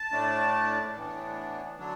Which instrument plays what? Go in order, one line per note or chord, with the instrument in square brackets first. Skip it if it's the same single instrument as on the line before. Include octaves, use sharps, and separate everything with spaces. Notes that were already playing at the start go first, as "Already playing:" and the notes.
Already playing: [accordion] A5
A2 A3 D4
A2 E3 B3 D4
D3 F#3 D4